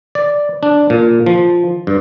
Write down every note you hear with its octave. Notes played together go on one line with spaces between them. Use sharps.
D5
D4
A#2
F3
G2